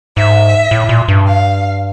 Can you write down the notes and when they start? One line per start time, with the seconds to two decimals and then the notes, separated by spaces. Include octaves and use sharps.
0.17 G#2 E5
0.71 A2
0.89 A#2
1.08 G2
1.26 F5